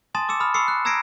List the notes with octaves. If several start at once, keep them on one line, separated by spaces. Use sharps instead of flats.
G#5 A5 C6 D#6 A6 E7
D6 E6 C#7 E7
B5 D#6 F6
B5 C#6 D#6 E6 C7 C#7
F#6
A#5 E6 G#6 A#6 C7 D7